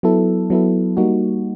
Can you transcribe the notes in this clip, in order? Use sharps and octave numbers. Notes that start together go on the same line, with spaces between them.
F#3 B3 E4 A4
F#3 B3 E4 A4
G3 A#3 D#4 F#4